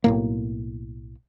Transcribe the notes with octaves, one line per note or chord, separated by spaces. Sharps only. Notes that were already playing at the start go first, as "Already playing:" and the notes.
B1 A2 A#3